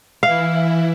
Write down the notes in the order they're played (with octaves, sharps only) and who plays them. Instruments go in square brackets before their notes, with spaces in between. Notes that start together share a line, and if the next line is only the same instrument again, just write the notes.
[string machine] E3 E4 [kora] F5